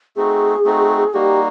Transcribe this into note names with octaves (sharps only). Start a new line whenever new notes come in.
A3 C4 D#4 F#4 G#4
A3 C4 D#4 F#4
G3 A#3 D#4 F#4 G4